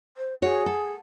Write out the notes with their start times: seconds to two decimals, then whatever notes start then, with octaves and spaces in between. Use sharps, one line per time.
0.17 C5
0.42 F#4 G#4 C#5
0.66 A4